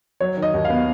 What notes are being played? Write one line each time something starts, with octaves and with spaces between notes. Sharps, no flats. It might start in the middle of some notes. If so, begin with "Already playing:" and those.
F#3 C#5
D#3
D#5
D#2
B3 F5